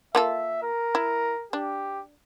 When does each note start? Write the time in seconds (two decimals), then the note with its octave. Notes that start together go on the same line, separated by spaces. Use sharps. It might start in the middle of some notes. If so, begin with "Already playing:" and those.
0.15 A#3 F4 A4 E5
0.63 A#4
0.95 E4
1.53 D4 G4